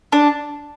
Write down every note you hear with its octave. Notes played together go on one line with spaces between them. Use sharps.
D4